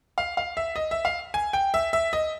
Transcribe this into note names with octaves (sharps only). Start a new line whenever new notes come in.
F5
F5
E5
D#5
E5
F5
G#5
G5
E5
E5
D#5